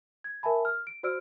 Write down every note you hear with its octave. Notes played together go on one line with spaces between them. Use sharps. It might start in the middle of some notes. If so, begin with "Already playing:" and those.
G#6
A#4 E5 G#5 A5 B5
F6
D7
F#4 C5 D5 E6 F6 D7